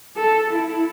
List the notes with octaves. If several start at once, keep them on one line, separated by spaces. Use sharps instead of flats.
A4
E4